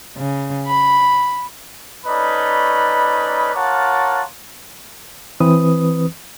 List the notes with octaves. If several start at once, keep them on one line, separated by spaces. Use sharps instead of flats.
C#3
B5
A3 C#4 D#4 B4 D5 B5
F4 A#4 C#5 F#5 A5 D6
E3 C4 B4 D#6